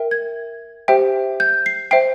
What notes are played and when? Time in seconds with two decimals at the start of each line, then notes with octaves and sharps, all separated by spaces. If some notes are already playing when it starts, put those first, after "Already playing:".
Already playing: A#4 E5 G5
0.11 G#6
0.88 G4 C5 E5 G5
1.40 G6
1.66 C7
1.91 C5 E5 G5 C7